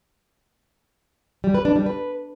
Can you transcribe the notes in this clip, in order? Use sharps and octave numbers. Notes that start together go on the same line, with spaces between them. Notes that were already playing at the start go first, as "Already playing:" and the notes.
G3
B4
D4
G3
B4